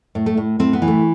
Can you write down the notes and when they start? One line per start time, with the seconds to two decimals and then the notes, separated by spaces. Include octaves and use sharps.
0.15 A2
0.26 A3
0.37 A2
0.59 A2 C4
0.73 B3
0.82 E3
0.88 A3